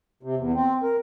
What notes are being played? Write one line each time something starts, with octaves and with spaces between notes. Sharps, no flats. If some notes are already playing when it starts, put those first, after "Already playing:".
C3
E2
C4
A#4